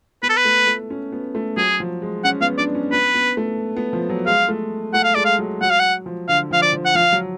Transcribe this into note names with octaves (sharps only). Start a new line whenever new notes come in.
B3 B4
A4
B4
A3
A3
C#4
B3
A3
F#3 G#4
F3
G#3
C#4 F#5
B3 F5
D4 D5
C#4
B3 B4
B3
A3
B3
F3
F#3
G#3 F5
A3
A3 F#5
F5
G#3 D5
F5
F#3
F#3 F#5
F5
F#5
F3
D3 F5
F3 F5
D5
F3
F#5
F3 F5
F#3